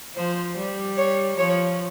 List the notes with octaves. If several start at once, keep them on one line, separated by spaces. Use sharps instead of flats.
F3 C5
G3
C#5
F3 C#5